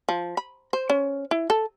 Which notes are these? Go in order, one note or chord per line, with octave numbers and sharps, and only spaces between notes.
F3
B5
C5
C#4
E4
A4